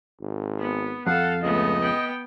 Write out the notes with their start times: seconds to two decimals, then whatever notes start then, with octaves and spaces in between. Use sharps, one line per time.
0.21 G#1
0.60 B3
1.07 F2 A4 F5 F#5
1.43 C#2 A3 B3 D#5
1.80 B3 G5